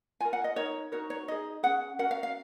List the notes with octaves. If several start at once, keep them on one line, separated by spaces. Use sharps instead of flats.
F4 A#4 G#5
F#5
D#5
D#4 A#4 C#5
D#4 F#4 A#4 C#5
C#5
D#4 G#4 D#5
C#4 G#4 F#5
C#4 F#4 A#4 F#5
F5
F5